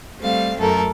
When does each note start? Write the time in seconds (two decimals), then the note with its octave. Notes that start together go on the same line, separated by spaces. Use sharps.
0.20 G3 A3 C4 F5
0.57 F#2 A3 A4 A#4